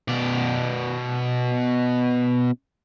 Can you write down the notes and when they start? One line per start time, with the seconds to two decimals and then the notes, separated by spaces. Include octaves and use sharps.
0.08 B2 D5